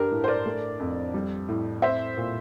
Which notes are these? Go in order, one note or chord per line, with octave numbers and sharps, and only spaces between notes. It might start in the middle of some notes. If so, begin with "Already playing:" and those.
Already playing: G2 D4 G4 A#4
A2
C5
A#4 D5
A3
F2
G3
A2
C4 C5 E5
A#2